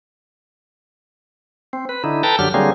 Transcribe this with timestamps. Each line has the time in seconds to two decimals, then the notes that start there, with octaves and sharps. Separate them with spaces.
1.73 C4
1.89 B4
2.04 D3 D#4 E4
2.23 A4 B4 G5 A5 A#5
2.39 F#2 D3 F#3 G4 F6
2.54 D3 F#3 G3 A#3 C4 G#4